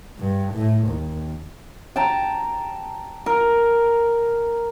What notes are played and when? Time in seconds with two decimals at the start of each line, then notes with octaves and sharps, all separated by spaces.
0.19 G2
0.54 A2
0.88 D#2
1.96 G5 A5 A#5
3.26 A#4